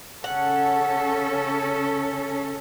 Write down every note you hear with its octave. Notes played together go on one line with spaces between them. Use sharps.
C#3 C#4 A4 F#5